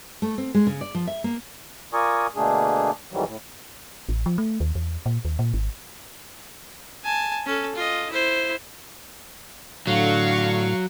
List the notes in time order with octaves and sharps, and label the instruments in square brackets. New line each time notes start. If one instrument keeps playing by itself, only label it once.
[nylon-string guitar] A3
C4
G#3
C#3
D5
F3
E5
A#3
[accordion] F4 A#4 D5 G#5 C#6 D#6
B2 D3 A3 A#3 D4 G#4
F2 G#2 D#3 E3 F#3 G3
A2
[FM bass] A1
F3
A3
D#2
E2
A#2
D#2
A#2
G#1
[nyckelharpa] G#5 A5
C#4 A4
F4 D#5
E4 C5
[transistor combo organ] A2 [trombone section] D3 [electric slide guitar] F#3 [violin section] F5 C#6